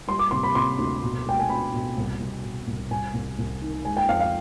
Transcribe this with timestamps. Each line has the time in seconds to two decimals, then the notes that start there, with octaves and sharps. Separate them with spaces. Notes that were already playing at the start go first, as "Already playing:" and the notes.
0.08 G3 C6
0.19 D6
0.31 C3 C6
0.43 B5
0.55 C3 C6
0.78 D2
1.03 B2
1.26 G#3 G5
1.39 G#5
1.49 B3 B5
1.73 B2
1.97 C2
2.19 C2
2.43 B2
2.67 C2
2.91 C2 G#5
3.14 C2
3.38 C2
3.61 D#3
3.84 G#3 G#5
3.97 G5
4.09 F2 F5
4.20 F5